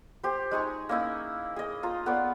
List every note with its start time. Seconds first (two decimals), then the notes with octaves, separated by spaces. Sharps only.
0.23 G4 C5
0.51 G#3 D#4 G#4 C#6
0.89 A#3 C#4 D#4 E4
1.56 G#4 D#5
1.83 F4 A#5
2.06 B3 B4 C#5 D5